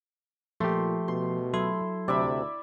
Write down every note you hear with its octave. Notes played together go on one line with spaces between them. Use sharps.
A#2 F3 A3 G4 C6
B2 C6
F#3 E4 A4 C6
D2 C3 D5 E5 B5